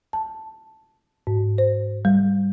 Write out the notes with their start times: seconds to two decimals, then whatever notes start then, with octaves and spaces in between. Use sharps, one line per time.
0.13 A5
1.27 G#2
1.58 C5
2.05 G3